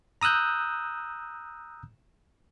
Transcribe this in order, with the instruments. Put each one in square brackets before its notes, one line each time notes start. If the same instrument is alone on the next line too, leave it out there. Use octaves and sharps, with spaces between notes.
[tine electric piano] A#5 D#6 E6 F#6 G6